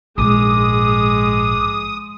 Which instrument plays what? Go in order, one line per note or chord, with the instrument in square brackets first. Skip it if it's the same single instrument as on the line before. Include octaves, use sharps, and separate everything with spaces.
[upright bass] A#1 G#2 [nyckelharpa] G#3 [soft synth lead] D6 [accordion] D#6